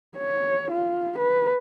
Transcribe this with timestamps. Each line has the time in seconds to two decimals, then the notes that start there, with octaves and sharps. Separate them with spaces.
0.17 C#5
0.71 F4
1.18 B4